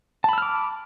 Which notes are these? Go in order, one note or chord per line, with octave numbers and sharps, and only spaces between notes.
A5 B5 D6 E6 F6